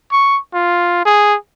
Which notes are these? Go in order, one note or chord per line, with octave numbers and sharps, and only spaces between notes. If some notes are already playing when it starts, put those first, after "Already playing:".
C#6
F4
G#4